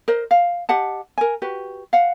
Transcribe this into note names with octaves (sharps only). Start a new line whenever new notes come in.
A#4 C5 D#5
F5
G4 D#5 F#5 A5
A#4 G#5
F#4 G4 B4
F5 F#5